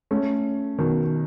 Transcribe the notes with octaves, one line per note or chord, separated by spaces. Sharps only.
A3 C#4
B2 D#3